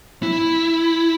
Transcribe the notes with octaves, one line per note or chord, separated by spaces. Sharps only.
E4